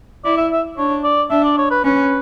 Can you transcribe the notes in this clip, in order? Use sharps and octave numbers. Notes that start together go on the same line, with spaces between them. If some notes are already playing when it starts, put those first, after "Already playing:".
E4 D5
E5
E5
D4 C#5
D5
D4 E5
D5
C#5
B4
C#4 B4